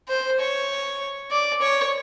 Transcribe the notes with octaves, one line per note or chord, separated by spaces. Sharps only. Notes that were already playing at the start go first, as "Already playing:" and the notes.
C5
C#5
D5
C#5